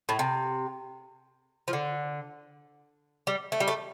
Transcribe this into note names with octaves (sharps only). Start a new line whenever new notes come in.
A2
C3
F3
D3
G3
A3
G3
A3